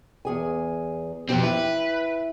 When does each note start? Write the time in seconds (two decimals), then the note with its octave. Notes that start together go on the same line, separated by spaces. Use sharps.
0.25 E2 G#4 G#5
1.29 B2 F3 C4 G4
1.43 E4 B4